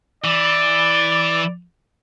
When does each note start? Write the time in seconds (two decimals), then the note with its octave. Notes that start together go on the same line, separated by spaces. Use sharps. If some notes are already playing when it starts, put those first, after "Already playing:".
0.24 E3 D5